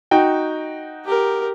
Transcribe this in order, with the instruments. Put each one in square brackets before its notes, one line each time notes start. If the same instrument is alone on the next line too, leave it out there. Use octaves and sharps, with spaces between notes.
[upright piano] D#4 F#4 G5
[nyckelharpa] G4 A#4